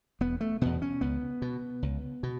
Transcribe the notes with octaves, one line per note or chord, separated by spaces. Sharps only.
E1 B3
A3
E2 B2 B3
C#4
C#2 B3
B2
C#2
B2